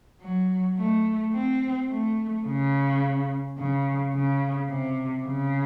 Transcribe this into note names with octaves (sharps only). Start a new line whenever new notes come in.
F#3
A3
C4
A3
C#3
C#3
C#3
C3
C#3